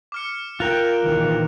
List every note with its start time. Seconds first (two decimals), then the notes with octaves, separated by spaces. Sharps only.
0.12 D6 F6 C#7
0.60 F4 A#4 G5 F#6 F7
1.04 A#1 D#3 E3